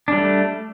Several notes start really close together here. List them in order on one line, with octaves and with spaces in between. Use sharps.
D4 G3 A3